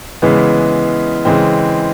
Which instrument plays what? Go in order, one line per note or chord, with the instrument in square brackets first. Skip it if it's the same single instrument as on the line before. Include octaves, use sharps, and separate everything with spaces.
[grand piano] C#3 E3 G#3 B3
C#3 E3 G#3 C4